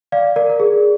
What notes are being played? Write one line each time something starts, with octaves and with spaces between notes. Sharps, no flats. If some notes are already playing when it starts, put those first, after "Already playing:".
D5 F5
A#4 D5
A#4
G#4